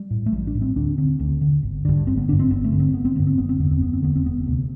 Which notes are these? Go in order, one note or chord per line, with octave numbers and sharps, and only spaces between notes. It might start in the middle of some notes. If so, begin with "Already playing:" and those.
Already playing: G3
A2
A3
A1 G3
D4
A2
C4
D2 D4
D3 C4
D2
D3
G1
G2 D3
G1 C4
B3
G2 D3 D4
C4
G1 B3
A3
G2 D3
C4
G1 B3
C4
G2 D3 B3
C4
F#1 B3
C4
E2 D3 B3
C4
F#1 B3
C4
E2 D3 B3
C4
E1 B3
D2 C3